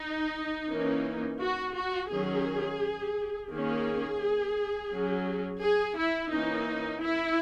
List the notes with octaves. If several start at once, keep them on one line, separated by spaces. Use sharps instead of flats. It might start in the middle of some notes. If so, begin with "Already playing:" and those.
Already playing: D#4
E3 A#3 C#4
F#4
F#4
D#3 F#3 C#4 G#4
D#3 A#3 C#4 G#4
F#3 C#4
G#4
E4
E3 A#3 C#4 D#4
E4